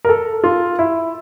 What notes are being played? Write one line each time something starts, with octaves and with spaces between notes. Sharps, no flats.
A#4
A4
F4
E4